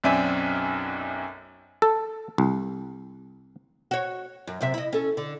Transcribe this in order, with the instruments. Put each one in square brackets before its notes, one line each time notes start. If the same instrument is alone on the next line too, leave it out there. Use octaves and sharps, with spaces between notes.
[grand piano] B1 F#2 C4 D5 E5 G#5
[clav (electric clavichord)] A4
C2
[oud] F#4 C#5
F#2
F#2 C3 E5
E4 D#5
C#4 A4
D3